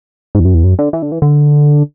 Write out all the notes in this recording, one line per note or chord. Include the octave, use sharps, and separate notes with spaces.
G#2
E2
F#2
E2
F#2
D3
E3
D3
E3
D3